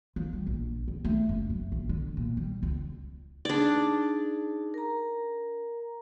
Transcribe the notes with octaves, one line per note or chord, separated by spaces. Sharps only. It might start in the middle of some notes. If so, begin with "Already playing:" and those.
F3
G3
A#1
C#2
A3
F#1
F#3
A#1
D3
A#2
G3
C#2
D4 D#4 G#4 D5
A#4 A#5